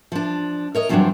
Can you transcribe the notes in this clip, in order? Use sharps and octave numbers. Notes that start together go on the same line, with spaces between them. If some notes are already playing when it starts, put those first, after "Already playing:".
F3 D4
A#4 C#5 D#5
E2 G2 F3 F#3 C4 D4